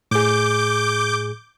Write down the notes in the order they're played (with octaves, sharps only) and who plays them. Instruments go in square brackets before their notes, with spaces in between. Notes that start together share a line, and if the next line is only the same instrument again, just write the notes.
[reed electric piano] A2 G#4 [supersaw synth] D6 G6